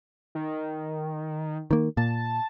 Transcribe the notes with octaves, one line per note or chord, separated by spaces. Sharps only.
D#3
D#3 A#3
A#2 A5